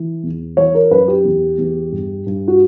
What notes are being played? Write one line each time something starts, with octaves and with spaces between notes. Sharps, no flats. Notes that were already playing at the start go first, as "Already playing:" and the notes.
Already playing: E3
E2
E3 C#5
A#4
F#2 B4
G4
E2
E2
G2
G2
F#4